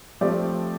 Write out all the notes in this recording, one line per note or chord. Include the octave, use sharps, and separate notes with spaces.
F3 A3 C4 G4 D5